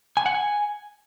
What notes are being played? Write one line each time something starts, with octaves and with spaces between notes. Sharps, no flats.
G#5
F#5
G#5